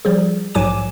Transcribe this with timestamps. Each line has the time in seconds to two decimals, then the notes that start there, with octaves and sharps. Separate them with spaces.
0.05 F3 G3 G#4
0.54 A#1 G#2 F#3 G#5 D6 E7